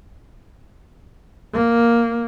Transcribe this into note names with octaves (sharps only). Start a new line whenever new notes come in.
A#3